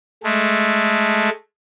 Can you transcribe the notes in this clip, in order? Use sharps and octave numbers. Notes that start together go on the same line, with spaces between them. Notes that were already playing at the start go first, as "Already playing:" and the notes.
G#3 A3